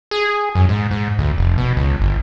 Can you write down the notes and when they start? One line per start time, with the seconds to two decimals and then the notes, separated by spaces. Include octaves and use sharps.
0.11 G#4
0.55 F#2
0.69 G#2
0.91 G#2
1.18 D2
1.38 F1
1.58 B2
1.77 C#2
2.01 G1